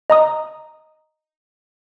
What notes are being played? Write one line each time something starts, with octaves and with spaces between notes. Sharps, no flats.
D#5 A#5 D#6